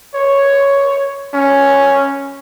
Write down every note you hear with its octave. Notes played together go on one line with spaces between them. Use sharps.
C#5
C#4